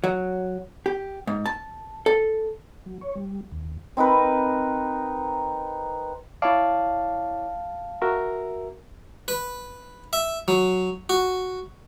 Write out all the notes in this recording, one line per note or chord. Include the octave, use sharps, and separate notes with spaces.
F#3
G4
G#2
A5
A4
F#3
C#5
G3
D#2
C4 D#4 A#4 B4
E4 C#5 D5 F5 A5
F#4 A#4 E5
B4
E5
F#3
F#4